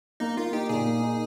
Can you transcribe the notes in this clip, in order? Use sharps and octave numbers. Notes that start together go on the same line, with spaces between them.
A#3 D#4
A#3 F4
D#4 G4
A#2 G#4
A#3
D#4